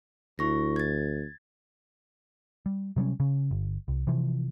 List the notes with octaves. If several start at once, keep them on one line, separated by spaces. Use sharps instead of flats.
D2 E4 C#6 A#6
G#6 A6
G3
C3 F#3 G3 C#4
C#3 C#4
G1
C2
C3 E3 F3